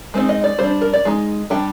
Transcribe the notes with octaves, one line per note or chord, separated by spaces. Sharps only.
G#3 C4 D#4
D#5
D5
G3 D4 C5
A#4
D5
G#3 D#4
G3 D4 G5